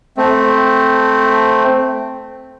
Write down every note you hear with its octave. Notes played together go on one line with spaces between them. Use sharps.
A3 C4